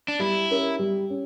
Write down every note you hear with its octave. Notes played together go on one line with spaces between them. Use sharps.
D4
G3 E4
C#4 G4 A#4
G3
C#4 G4